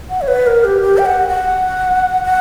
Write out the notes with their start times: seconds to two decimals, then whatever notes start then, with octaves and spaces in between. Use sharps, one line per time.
0.10 F#5
0.21 C#5
0.28 B4
0.47 A#4
0.64 G4
0.82 G4
0.98 G5
1.06 F#5
1.29 F#5
2.24 F#5